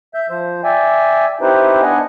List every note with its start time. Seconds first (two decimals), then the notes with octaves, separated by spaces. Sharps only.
0.14 E5 G6
0.30 F3 C5
0.64 D5 E5 G5 G#5
1.41 C4 D#4 E4 G4 B4 C5
1.82 B3 D4 D#5 F#5 G#5